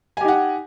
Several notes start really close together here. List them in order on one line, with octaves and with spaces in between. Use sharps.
G#5 G4 D#4 F#5